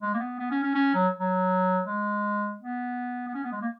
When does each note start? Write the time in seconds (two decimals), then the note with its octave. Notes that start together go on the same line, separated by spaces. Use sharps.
0.02 G#3
0.14 A#3
0.20 B3
0.39 B3
0.51 C#4
0.63 C#4
0.75 C#4
0.94 F#3
1.20 F#3
1.87 G#3
2.61 B3
3.28 B3
3.35 C#4
3.44 B3
3.52 G#3
3.62 A#3